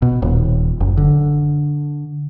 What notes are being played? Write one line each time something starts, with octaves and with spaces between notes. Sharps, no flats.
B2
D#1
F#1
D3